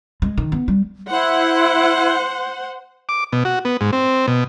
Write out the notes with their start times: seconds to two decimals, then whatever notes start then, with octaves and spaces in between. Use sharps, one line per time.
0.22 G#3
0.38 D#3
0.52 B3
0.68 G3
1.10 E4 C5 F#5
3.09 D6
3.32 B2
3.45 F#4
3.65 B3
3.81 G#2
3.93 C4
4.28 B2